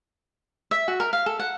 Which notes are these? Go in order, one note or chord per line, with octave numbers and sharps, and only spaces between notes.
E5
F#4
A#4
F5
A4
F#5